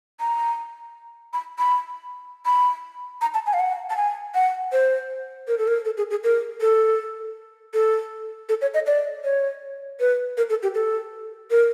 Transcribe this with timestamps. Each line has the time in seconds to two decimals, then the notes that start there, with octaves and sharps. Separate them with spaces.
0.20 A#5
1.33 B5
1.59 B5
2.46 B5
3.21 A#5
3.34 A5
3.46 G#5
3.53 F5
3.60 F#5
3.90 A5
3.97 G#5
4.35 F#5
4.72 C5
5.48 A#4
5.58 A4
5.68 A#4
5.85 A4
5.97 G#4
6.11 G#4
6.24 A#4
6.61 A4
7.74 A4
8.49 A4
8.62 C#5
8.74 D#5
8.87 D5
9.24 C#5
10.00 B4
10.37 A#4
10.50 A4
10.63 G4
10.75 A4
11.51 A#4